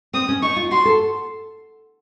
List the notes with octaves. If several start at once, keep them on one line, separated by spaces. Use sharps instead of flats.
C4 D#6
C#4
D#4 C#6
F4
F#4 C6
A4